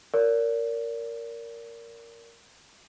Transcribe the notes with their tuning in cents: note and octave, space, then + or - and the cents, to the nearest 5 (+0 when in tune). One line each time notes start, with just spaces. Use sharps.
A#4 -5 D5 -35